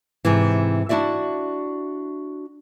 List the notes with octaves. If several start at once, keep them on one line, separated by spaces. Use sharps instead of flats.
G#2 C3 E3
D4 E4 F#4 D5 E5